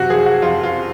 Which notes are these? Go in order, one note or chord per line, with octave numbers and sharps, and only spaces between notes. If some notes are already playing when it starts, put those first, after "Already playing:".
Already playing: F#2 C3 F#4
F3 G#4
F#4
F2 F4
F4